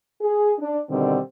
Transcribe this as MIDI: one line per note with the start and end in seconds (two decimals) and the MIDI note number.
0.22 0.53 68
0.59 0.78 62
0.90 1.18 47
0.90 1.18 50
0.90 1.18 51
0.90 1.18 55
0.90 1.18 60